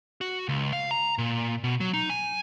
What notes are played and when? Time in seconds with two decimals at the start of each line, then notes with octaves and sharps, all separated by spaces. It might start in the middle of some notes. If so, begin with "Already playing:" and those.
0.21 F#4
0.49 C#2
0.73 F5
0.91 A#5
1.18 A#2
1.64 B2
1.80 F#3
1.93 D#4
2.10 G#5